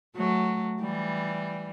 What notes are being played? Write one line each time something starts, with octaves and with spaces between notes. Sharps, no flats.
F#3 A3
E3 G3